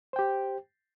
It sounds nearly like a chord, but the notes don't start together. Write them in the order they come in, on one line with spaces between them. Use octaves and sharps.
C5 G5 G4